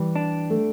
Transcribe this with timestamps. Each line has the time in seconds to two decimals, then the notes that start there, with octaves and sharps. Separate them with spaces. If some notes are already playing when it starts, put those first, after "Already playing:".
Already playing: E3 G3
0.16 D4
0.50 A3